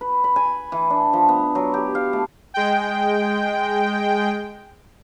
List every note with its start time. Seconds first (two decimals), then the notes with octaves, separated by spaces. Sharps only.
0.01 B4
0.24 B5
0.36 G#5
0.72 E3
0.90 D4
1.13 F3
1.29 B3
1.55 F#3
1.74 G4
1.95 F5
2.13 A3
2.54 G#3 G5